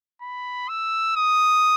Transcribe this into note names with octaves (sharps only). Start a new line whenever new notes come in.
B5
E6
D#6